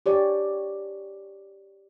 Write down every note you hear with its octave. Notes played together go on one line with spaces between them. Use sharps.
G4 C#5 D5